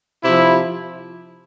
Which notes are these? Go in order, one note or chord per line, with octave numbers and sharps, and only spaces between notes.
C3 F3 E4